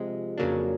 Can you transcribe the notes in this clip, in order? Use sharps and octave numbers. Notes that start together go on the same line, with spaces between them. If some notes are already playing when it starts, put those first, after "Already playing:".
Already playing: C3 F3 G#3
F2 C#3 F#3 A#3 D4